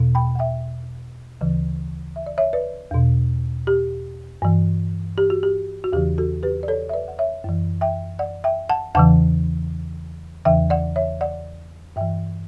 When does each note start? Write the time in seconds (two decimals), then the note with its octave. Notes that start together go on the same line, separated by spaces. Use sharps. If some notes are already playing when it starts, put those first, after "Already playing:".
Already playing: E2 B2
0.15 G5 B5
0.35 F#5
0.39 E5 G5
1.41 D2 C#3 E3
2.16 E5
2.26 D5
2.38 C#5 E5
2.53 B4 D5
2.91 E2 B2
3.67 G4
4.42 G2 E3
5.18 G4
5.30 F#4
5.43 G4
5.84 F#4
5.93 E2 C#3 E3 G4
6.18 F#4 A4
6.43 G4 B4
6.63 D5
6.68 A4 C#5
6.89 E5
6.94 B4 D5
7.08 F#5
7.19 C#5 E5
7.44 F#2 E3
7.81 E5 G5
8.19 D5 F#5
8.44 E5 G5
8.69 F#5 A5
8.95 E2 C#3 E3 F#5 A5
10.45 E2 C#3 E3 E5 G5
10.70 D5 F#5
10.96 C#5 E5
11.21 D5 F#5
11.96 G2 E3 E5 G5